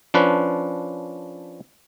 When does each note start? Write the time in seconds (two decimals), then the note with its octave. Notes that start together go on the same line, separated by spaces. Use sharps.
0.14 F3 C#4 D4 B4